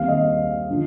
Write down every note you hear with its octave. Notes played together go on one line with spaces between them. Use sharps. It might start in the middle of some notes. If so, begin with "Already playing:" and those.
Already playing: D#2 D#3 G3 C4 F5
D#5
D3 F3